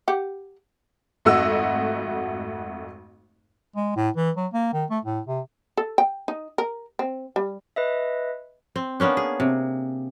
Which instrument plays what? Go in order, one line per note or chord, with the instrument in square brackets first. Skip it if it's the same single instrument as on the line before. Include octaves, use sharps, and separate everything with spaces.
[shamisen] G4 F#5
[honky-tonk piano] G#1 F2 A3 F#4 D#5 E6
[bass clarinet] G#3
A2
E3
F#3
A#3
D#3
A3
A2
C3
[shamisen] A4
G5
D#4
A#4
C4
G3
[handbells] B4 D#5 E5
[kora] C4
A#3 B3 C#4 D4
G#4
C3